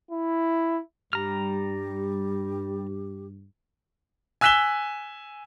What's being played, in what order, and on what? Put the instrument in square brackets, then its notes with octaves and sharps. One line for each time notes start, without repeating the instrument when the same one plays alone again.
[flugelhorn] E4
[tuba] G2 [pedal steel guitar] G3 A#5 F6 [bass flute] G4
[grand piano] G#5 E6 F#6 B6 E7 G7